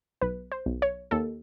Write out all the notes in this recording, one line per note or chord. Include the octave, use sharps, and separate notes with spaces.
B1 B4
C5
B1
C#5
D#2 A4